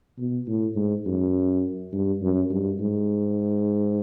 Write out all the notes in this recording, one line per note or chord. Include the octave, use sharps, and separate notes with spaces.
B2
A2
G#2
F#2
G2
F#2
G2
G#2